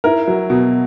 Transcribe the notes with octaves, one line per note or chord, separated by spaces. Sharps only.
E4 A#4
F#3
B2